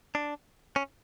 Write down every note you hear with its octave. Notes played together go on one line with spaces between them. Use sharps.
D4
C#4